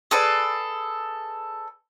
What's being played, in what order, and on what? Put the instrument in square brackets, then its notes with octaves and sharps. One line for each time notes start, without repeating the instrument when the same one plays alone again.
[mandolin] G#4 A4 B4 D5